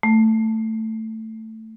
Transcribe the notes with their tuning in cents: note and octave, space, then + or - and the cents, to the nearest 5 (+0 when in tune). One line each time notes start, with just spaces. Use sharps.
A3 +10